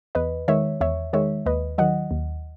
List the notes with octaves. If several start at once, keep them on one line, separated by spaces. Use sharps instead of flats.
E2 B4 D#5
D#3 G#3 C#5 E5
E2 C#5 E5
D#3 G#3 C#5 E5
D#2 B4 D#5
D#3 F#3 D#5 F#5
D#2